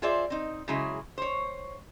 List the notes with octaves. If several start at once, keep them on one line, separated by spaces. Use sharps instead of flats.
F4 G#4 C5 D5 E5
C4 D#4
C#3 F#3 G#3 E4 G#4
C5 C#5